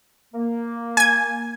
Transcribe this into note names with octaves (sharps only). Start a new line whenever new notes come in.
A#3
G#5 G#6